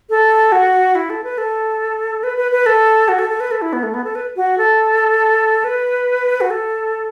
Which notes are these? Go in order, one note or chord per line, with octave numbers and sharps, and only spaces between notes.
A4
F#4
E4
A4
B4
A4
B4
B4
B4
A4
F#4
A4
A4
B4
A4
E4
B3
A3
B3
A4
B4
F#4
A4
B4
F#4
A4